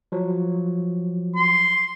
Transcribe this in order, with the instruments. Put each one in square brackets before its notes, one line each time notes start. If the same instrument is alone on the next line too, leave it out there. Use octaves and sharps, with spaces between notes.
[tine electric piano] F3 F#3
[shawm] C6